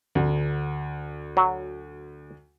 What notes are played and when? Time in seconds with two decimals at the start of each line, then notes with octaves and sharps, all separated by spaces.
0.15 D2
1.37 F#3